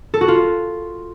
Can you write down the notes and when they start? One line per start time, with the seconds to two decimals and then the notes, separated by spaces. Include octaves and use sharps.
0.14 A4
0.21 F#4
0.28 F4